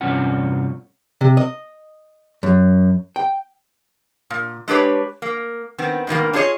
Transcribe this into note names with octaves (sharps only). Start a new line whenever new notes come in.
E2 G2 C3 C#4 F4 F#5
C3
D#5
F#2
G5
A#2
G#3 D4 G4 B4 C#5
A#3
D#3 B3 C4
G#2 B2 D#3 A#3
D4 F4 G#4 C5 C#5 D#5